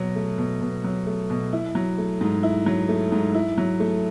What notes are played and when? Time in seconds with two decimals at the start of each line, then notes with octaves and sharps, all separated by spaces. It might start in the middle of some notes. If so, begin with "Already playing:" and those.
Already playing: B2 F#3
0.16 A3
0.38 B2
0.61 B2
0.84 F#3
1.07 A3
1.30 B2
1.53 E4
1.75 F#3
1.98 A3
2.21 G#2
2.43 E4
2.66 F#3
2.89 A3
3.12 G#2
3.35 E4
3.58 F#3
3.80 A3